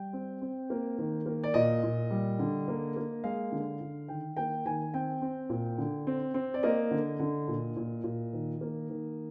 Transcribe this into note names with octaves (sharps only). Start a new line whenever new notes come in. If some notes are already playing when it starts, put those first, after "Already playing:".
Already playing: G3 G5
C4
C4
A#3
D#3
A#3
D5
A#2 D#5
A#2
G3
D3
A#3
A#3
G#3 F5
D3
D3
D#3 G5
A#3 G5
D#3 G#5
C4 G5
C4
A#2
D3
C4
C4
D5
A#3 D#5
D3
D3
A#2
A#2
A#2
D#3
A#3
D#3